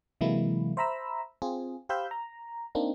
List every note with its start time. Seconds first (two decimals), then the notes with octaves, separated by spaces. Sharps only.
0.21 C3 E3 F#3 G#3 A#3 E4
0.77 C5 E5 A#5 B5 E6
1.42 C4 F4 G#4
1.89 G4 C5 F5 B5 E6 G6
2.11 A#5
2.75 A#3 C4 D4 D#4